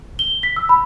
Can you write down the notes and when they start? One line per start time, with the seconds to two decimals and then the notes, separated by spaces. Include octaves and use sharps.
0.19 G7
0.43 B6
0.56 E6
0.69 B5